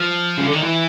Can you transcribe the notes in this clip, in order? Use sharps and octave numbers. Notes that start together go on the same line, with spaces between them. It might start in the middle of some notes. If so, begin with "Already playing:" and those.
Already playing: F3
C#3
D3
D#3
E3